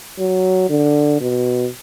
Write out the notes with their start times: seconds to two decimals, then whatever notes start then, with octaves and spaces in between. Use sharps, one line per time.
0.19 F#3
0.70 D3
1.21 B2